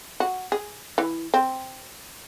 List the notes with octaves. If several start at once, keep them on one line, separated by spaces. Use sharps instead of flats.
F#4
G#4
E3
C4